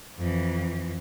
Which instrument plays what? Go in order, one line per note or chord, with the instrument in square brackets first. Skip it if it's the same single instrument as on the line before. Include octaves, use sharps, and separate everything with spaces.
[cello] F2 E3